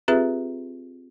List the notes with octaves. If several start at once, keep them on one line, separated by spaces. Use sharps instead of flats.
C4 F4 G4 G#4 B4 E5